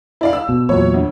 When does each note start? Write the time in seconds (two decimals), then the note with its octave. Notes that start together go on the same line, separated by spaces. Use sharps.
0.21 E4 D5 F5
0.33 E6
0.49 B2
0.69 E2 A#2 F#3 C#5
0.94 D2